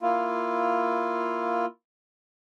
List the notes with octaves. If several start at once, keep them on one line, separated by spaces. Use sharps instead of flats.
A#3 E4 F4